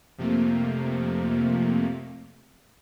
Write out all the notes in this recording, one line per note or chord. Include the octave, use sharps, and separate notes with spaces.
F2 C3 F3 A3 A#3